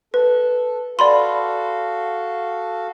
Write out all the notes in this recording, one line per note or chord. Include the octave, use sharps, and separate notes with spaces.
A4 B4
F#4 A4 D5 F5 B5 C6